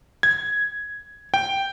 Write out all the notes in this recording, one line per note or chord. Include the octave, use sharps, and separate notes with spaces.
G#6
G5